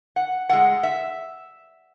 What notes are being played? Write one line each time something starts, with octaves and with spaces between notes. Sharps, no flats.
F#5
A2 G#3 F#5
E5